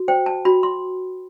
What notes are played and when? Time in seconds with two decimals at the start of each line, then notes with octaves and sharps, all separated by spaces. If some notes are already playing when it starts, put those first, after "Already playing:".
Already playing: F#4
0.08 C5 G5
0.26 A5
0.45 F#4 B5
0.63 C6